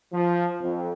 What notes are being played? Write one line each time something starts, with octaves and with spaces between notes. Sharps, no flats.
F3
F2